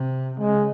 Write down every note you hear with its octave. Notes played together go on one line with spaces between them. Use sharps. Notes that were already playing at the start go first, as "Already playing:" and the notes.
Already playing: C3
C#3 G#3